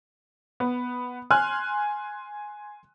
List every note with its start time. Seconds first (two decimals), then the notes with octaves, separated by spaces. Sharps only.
0.60 B3
1.31 G#5 C6 F6 F#6